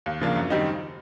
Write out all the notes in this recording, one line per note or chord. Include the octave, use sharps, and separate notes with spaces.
D#2
C#3 F3 A#3 D4
F#2
D#3 G3 C4 D#4